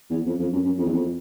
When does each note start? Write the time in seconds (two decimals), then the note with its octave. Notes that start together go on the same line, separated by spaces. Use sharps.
0.10 E2
0.26 F2
0.39 F2
0.53 F#2
0.65 F#2
0.78 F2
0.86 E2
0.94 F2